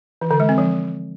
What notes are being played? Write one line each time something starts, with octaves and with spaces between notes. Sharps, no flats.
E3
D3
G#3
C4
F3